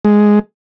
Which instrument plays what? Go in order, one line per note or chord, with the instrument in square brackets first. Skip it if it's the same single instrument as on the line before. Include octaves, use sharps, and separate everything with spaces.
[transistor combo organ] G#3